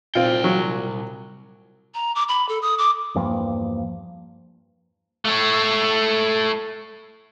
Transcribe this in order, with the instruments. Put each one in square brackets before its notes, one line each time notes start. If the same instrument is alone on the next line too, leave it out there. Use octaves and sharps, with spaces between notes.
[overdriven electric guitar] C2 G5 [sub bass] A#2 [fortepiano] C4 F4
[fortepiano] F#3
[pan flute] A#5
D6
B5
A4
D#6
D6
[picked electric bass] E2 G2 F3 A#3
[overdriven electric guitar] A3 C#5